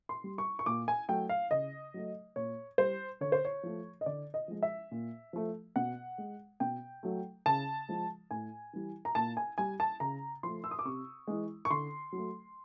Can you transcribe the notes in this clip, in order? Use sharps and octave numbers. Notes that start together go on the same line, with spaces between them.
C6
G3
C#6
C#6
A#2 D6
G#5
F#3 A3 G5
F5
C#3 D#5
F#3 A3
A#2 C#5
G3 C5
D3 C#5
C5
C#5
F3 A3
D#5
D3 D5
D#5
F3 G#3
E5
A#2
F3 A3
B2 F#5
G#3
B2 G5
F#3 A3
C#3 A5
F3 G#3
A2 G#5
E3 G3
A#5
A#2 A5
G#5
G3 G#5
A5
C#3 A#5
F3 A3 C6
E6
D#6
D6
C3 C#6
E3 G#3
C#6
D3 C6
F#3 A3